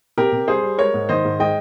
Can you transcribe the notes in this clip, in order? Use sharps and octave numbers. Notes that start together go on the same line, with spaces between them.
C3 G4 A#4
C3
G3 G#4 C5
G3
G#3 A#4 C#5
G#2
D#3 C5 D#5
G#2
G#3 D#5 G5